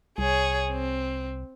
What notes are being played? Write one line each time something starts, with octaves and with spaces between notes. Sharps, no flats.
C2 G#4 C#5
C4